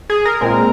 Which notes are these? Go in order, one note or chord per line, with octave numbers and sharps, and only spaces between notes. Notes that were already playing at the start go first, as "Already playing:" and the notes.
G#4
A#4
A#2 G#3 C4